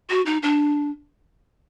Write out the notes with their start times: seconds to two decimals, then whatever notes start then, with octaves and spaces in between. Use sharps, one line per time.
0.10 F#4
0.26 D#4
0.43 D4